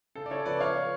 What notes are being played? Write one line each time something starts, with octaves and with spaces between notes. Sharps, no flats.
C#3 A4
D5
C#3 A4 C#5
F3 B4 D5
F3 C#5 F5
B3